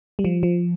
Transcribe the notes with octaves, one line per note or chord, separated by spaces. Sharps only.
G3
F3
F3